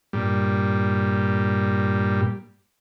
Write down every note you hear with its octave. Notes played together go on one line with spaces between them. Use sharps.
G2 A#2 G3